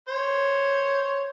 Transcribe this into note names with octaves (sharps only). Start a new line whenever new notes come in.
C5 C#5